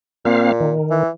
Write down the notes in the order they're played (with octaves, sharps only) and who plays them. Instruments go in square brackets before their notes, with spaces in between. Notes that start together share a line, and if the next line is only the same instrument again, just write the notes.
[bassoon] A#2 [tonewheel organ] A#3 C4 F5
[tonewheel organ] D#3
[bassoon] E3